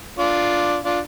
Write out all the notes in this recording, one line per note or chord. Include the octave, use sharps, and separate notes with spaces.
D4 F4
D4 F4